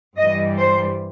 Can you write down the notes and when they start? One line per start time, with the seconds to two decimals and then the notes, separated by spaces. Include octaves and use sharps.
0.17 G2 E3 G3 D#5
0.59 C5